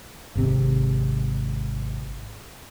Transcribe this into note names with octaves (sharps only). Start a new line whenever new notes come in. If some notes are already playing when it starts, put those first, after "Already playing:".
G#1 C3